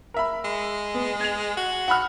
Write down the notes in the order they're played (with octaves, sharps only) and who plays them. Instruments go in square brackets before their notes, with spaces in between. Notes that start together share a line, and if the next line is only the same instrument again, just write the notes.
[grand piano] A#4 E5 B5
[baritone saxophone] G#3
[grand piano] B3
G#6 F7
[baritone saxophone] F#4
[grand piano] F#5 B5 F6